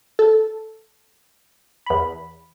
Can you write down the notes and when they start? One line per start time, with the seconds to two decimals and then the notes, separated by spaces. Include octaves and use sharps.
0.19 A4
1.86 E2 B5